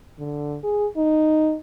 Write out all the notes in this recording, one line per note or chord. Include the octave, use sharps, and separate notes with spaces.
D3
G#4
D#4